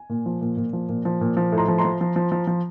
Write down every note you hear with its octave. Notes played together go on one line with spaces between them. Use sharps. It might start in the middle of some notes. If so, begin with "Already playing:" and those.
Already playing: G#5
A#2
F3
A#2
A#2
F3
A#2
F3
A#2
F3
A2
A#5 C6
F3
A#5 C6
F3
F3
F3
F3
F3